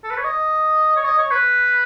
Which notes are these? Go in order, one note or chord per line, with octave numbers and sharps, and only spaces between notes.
A4
B4
C#5
D#5
C#5
D#5
C#5
B4